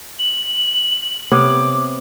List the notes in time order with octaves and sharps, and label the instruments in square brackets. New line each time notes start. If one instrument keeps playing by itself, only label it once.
[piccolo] F#7
[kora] C3 B3 C#5 [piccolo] D6